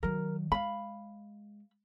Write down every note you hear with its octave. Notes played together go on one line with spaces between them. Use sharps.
D#3 F#3 A#4
G#3 F5 B5